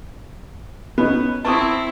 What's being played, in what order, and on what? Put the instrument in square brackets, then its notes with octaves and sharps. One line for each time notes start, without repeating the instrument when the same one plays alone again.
[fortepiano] B3 C#4 D#4
[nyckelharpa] C4 E4 [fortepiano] A5 C#6 D#6